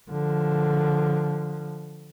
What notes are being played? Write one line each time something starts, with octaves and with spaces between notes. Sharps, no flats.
D3 F3